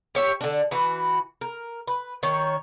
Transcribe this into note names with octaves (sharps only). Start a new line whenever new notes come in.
G4 C#5 E5
D3 D4
E3 F#4 B4
A#4
B4
D#3 C#5